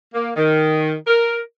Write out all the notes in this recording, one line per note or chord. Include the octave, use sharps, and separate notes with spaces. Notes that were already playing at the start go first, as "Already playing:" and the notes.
A#3
D#3
A#4